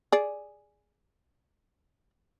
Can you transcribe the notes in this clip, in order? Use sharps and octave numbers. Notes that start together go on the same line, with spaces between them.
G#4 D5